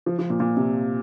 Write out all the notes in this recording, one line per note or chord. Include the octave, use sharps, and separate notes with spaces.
F3
F3
A#2
A#2
C3